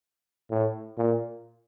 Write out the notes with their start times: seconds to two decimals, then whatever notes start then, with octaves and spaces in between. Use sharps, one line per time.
0.50 A2
0.98 A#2